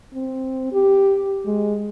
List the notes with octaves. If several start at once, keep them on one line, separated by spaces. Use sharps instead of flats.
C4
G4
G#3